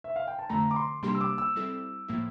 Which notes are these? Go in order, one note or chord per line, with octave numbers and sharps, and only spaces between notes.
E5
F5
G5
A5
F2 D3 A3 A#5
D6
C6
C3 G3 A#3 D4 G4 C6
E6
D6
E6
G3 C4 E4 A4
A2 F3 A#3 E4